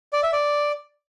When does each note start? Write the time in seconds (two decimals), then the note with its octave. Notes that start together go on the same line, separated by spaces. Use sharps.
0.13 D5
0.23 E5
0.33 D5